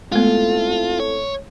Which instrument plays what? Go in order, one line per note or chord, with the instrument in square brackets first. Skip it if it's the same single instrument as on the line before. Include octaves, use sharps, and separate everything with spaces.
[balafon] G#3 A3 B3 [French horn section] C4 E4 A4 [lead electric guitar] F4
[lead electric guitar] C#5